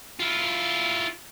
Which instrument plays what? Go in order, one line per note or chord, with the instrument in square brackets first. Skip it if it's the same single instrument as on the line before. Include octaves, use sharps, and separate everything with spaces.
[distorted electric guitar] E4 F4